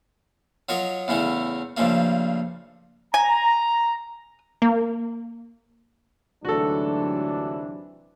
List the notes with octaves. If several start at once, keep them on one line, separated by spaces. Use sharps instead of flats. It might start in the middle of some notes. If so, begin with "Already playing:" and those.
F#3 F4 F#4 A#4 D#5
E2 C#3 A3 C#4 E4
G2 C#3 F3 A3 A#3
G#5 A#5
A#3
D2 G#2 C3 E3 F#3 D4 F#4 A4